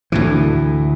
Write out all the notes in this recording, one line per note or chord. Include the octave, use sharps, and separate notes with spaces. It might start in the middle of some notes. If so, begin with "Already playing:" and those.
D2 A2 E3